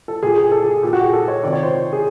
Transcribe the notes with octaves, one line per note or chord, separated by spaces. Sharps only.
A4
A#2 G#4
G#4
A4
G#4
A#2 G4
F#4
G#4
A4
C#5
C3 D#3 D5
C#5
C5
G#4